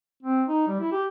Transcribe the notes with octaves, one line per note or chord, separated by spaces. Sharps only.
C4
D#4
G3
E4
G4